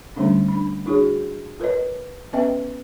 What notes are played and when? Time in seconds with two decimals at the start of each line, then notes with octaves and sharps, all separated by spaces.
0.16 D3 D#3 G3 A3 C#4 D4
0.48 D4 B5
0.86 D4 E4 F#4 G#4 C#5
1.60 F4 A#4 B4 C#5 D#5
2.33 B3 C#4 B4 D#5 E5 G5